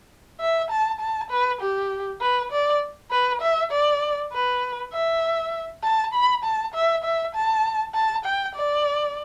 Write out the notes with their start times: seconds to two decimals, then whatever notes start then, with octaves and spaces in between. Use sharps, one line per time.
0.41 E5
0.70 A5
1.00 A5
1.30 B4
1.61 G4
2.21 B4
2.52 D5
3.11 B4
3.42 E5
3.72 D5
4.33 B4
4.93 E5
5.83 A5
6.14 B5
6.44 A5
6.74 E5
7.04 E5
7.35 A5
7.95 A5
8.25 G5
8.55 D5